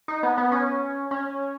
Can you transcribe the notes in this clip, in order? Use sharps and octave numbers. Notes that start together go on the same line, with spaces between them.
D#4
B3
B3
C#4
C#4